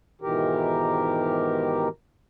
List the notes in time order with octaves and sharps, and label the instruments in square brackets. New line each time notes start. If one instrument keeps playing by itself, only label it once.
[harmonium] G#2 B2 D#3 E3 G4 A#4